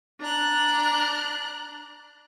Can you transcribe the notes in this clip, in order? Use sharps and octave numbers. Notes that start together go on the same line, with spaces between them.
D4 A#5 F#6